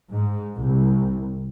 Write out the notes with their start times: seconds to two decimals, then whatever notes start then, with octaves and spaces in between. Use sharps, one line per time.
0.11 G#2
0.58 C2